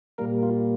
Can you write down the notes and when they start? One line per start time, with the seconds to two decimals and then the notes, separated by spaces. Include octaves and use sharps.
0.18 A#2 G3 A#3 A#4
0.43 F4